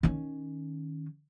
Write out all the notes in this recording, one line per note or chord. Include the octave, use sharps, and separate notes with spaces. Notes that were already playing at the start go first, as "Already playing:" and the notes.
D#3 C#4